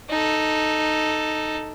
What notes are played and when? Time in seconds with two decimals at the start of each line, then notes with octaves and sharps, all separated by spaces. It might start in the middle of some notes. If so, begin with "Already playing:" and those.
0.10 D#4 A4